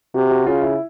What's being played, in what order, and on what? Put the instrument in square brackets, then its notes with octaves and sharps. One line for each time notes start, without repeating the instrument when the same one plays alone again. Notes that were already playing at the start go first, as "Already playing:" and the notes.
[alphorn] C3 [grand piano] F#4
[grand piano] F#4
[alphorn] C#3 [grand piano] F4
[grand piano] E4